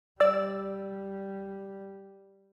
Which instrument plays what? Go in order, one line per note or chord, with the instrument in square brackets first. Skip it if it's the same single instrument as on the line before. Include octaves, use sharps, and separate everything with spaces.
[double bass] G3 [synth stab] D5 E6